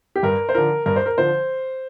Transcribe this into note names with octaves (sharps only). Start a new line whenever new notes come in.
G4
G2 A#4
C5
D3 F3 A#4
G2 A#4
C5
A#4
D3 F3 C5